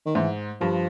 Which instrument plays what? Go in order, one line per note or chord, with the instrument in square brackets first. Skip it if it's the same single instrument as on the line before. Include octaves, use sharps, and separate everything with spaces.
[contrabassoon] D#3
[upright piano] G#2 [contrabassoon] E3
[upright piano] G2 [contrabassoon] F3